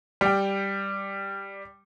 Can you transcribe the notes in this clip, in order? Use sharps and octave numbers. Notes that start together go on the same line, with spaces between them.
G3 G5